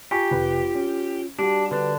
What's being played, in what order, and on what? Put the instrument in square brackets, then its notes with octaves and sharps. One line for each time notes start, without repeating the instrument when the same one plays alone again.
[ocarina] F4 [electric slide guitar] G4 [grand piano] G#5 A#5 C#6
[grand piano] F1 B4
C#4
[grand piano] G3 F#4 [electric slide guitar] D4 [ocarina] G4
[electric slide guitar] D3 D4 [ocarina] B4